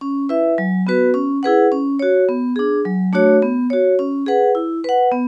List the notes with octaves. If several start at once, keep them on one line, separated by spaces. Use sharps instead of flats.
C#4
E4 B4 E5
F#3
B3 F#4 B4
C#4
E4 G#4 B4 F#5
C#4
F#4 C#5
B3
D4 G#4
F#3
A3 D4 F#4 C#5
B3
F#4 C#5
C#4
G#4 B4 F#5
E4
B4 F#5
B3